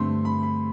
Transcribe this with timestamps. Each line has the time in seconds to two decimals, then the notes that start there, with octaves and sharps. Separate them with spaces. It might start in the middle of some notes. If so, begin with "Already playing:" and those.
Already playing: G2 D3 A3 C4 C6
0.25 B5
0.43 B5